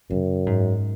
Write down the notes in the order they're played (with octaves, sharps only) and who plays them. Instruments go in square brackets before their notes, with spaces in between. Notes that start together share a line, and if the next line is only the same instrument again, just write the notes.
[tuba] F#2 [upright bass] C#3
[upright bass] G#2